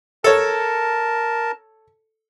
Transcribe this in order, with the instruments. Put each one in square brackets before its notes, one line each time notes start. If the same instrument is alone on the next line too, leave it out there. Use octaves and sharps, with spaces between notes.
[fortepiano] A4 C#5 [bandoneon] A#4 A5